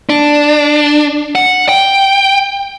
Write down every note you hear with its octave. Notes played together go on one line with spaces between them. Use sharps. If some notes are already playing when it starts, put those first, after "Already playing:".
D4
F#5
G5